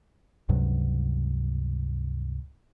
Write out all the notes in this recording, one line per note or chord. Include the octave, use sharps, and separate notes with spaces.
C#2 G2 C3 F#3